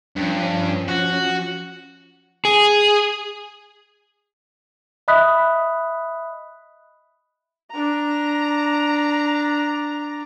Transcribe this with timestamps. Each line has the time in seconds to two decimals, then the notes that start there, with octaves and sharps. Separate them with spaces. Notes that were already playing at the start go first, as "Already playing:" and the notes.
0.16 G2 F3 C#4
0.88 F#4
2.45 G#4
5.08 D#5 E5 B5 D#6 F#6 B6
7.71 D4 A#5